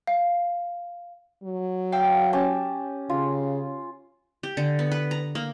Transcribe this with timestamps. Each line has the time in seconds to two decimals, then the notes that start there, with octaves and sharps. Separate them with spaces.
0.07 F5
1.43 F#3
1.92 F5 G5 E6
2.33 C#4 G4 A5
3.10 C#3 F4
4.43 G4
4.57 D3
4.79 B3
4.92 B4
5.11 A#5
5.35 A#3